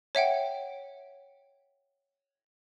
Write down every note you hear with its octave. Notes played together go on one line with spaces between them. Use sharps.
C#5 E5 F#5 G5